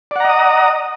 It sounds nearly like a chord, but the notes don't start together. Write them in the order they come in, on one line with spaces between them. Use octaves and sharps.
D5 F#5 A#5 D#5 D#6